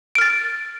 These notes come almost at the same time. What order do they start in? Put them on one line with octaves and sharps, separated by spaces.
D7 F6 A6